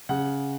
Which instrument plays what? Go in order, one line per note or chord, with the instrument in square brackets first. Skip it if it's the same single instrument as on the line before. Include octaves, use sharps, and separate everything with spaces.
[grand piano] C#3 F#5